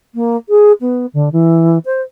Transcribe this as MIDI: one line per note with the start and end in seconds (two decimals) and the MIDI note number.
0.14 0.36 58
0.49 0.72 68
0.80 1.06 59
1.13 1.29 50
1.32 1.78 52
1.85 2.01 72